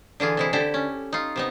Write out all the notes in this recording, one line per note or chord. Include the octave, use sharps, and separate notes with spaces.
D3 E3 F4 G#4
C3 G#3 E4
D3 E4 G4 A4
C#4
D#4 F4
C3 B3 D#4